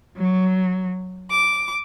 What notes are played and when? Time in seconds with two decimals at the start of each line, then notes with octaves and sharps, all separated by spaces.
0.17 F#3
1.31 D6